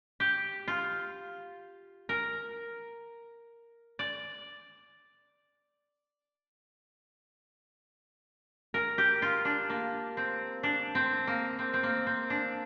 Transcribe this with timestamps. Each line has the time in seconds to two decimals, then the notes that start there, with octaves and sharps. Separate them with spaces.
0.20 G4
0.68 F4
2.09 A#4
3.99 D5
8.74 A#4
8.98 G4
9.22 F4
9.45 D4
9.70 A#3
10.17 C4
10.63 D4
10.95 C4
11.27 A#3
11.59 C4
11.74 C4
11.83 A#3
12.07 C4
12.30 D4